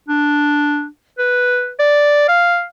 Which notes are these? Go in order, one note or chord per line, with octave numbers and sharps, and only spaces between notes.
D4
B4
D5
F5